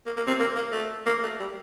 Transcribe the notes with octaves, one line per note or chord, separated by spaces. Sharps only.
A#3
A#3
C4
A#3
A#3
A3
A#3
A3
G3